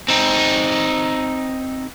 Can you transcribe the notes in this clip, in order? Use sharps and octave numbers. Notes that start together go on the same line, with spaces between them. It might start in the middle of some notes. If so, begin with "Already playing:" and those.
C4 D#4